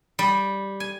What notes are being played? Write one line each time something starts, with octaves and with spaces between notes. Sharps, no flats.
G3
G#5